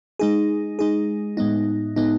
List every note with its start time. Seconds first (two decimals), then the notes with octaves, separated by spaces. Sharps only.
0.19 G#3 D#4 G#4
0.79 G#3 D#4 G#4
1.37 A2 G#3 B3 D#4
1.96 A2 G#3 B3 D#4